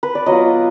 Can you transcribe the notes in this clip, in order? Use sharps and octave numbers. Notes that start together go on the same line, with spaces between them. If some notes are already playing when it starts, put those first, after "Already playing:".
B4
D5
F#3 B3 F4 D#5